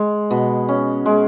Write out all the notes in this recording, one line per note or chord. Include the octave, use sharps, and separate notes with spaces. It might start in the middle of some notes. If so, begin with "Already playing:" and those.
Already playing: G#3
B2
C#4
G#3